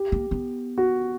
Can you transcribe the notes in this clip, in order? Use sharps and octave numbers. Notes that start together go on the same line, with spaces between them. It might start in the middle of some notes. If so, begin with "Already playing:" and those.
Already playing: G4
A#3
B3
F#4